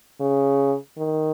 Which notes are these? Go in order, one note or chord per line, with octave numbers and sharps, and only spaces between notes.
C#3
D#3